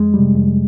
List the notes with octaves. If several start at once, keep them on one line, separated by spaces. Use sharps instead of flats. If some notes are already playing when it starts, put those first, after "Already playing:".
Already playing: F2 G#3
C3 G3
F2